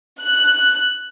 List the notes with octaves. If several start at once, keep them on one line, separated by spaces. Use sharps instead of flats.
F#6